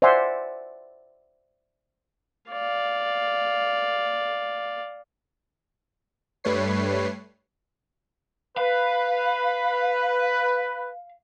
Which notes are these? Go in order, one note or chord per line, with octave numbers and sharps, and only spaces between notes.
C5 D5 E5 F#5 G#5 C6
D5 F5
G2 G3 A3 B4 C#5 C7
B4 F5